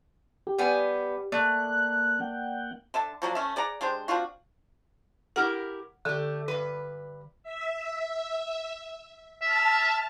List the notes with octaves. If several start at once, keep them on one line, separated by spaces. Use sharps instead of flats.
G4
G3 B3 G#5
A3 A#3 D5 F#6
A#3 F#5 G5
D3 E5 A5
F3 F#3 A#3 D4
A3 C#4 E5
G#4 D5 F#5 A#5
G#3 D4 G4 C5
C4 D4 F4 F#4
E4 G4 A#4 F#5 F6
D3 A3 G4
G2 B4
E5
E5 A5 F6